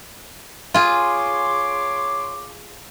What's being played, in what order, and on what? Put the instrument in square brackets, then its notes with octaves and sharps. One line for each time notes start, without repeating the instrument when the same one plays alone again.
[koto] F4 G#4 [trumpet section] C#5 C6 D6